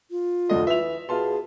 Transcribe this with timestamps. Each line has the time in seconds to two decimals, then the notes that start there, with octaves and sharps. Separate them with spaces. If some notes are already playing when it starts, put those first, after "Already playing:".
0.11 F4
0.49 F1 D2 D3 D#5
0.67 E3 E5 F7
1.09 B2 F4 G#4 A5 C6